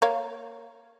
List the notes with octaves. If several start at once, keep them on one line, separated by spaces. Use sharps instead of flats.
A#3 C#5 F5